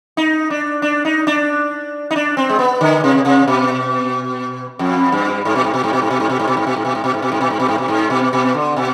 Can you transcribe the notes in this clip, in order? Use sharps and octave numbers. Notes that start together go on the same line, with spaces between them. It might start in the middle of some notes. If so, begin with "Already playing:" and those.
D#4
D4
D4
D#4
D4
D#4
D4
C4
G#3
B3
D3
C3
C3
B2
F2
G2
G#2
B2
G#2
B2
G#2
B2
G#2
B2
G#2
B2
G#2
B2
G#2
B2
G#2
B2
G#2
B2
G#2
B2
G#2
B2
G#2
B2
G#2
B2
G#2
B2
B2
D3
B2